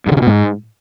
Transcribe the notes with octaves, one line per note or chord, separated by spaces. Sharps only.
G2
D3
C#3
B2
G#2